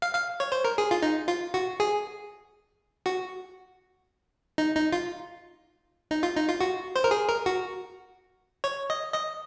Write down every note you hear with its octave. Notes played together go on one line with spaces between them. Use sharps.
F5
F5
C#5
C5
A#4
G#4
F4
D#4
F4
F#4
G#4
F#4
D#4
D#4
F4
D#4
F4
D#4
F4
F#4
C5
A#4
G#4
A#4
F#4
C#5
D#5
D#5